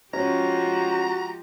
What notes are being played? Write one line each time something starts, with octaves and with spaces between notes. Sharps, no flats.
F3 G#3 C#4 F#4 G4 A#5